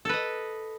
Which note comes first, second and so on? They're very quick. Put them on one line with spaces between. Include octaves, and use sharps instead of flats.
A4 B4 D#5